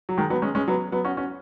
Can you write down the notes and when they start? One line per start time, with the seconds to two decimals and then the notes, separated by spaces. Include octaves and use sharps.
0.09 F#3
0.18 D#3 G#3
0.30 F#3 B3
0.42 G#3 C#4
0.55 G#3 C#4
0.68 F#3 B3
0.92 F#3 B3
1.05 C#4 F#4
1.17 C#4 F#4